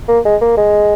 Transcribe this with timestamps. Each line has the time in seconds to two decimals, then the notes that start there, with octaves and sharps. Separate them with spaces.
0.08 A#3
0.25 G#3
0.41 A#3
0.57 G#3